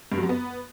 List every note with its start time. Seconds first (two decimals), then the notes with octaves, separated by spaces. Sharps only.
0.12 G2
0.17 F#3
0.23 F#2
0.29 B3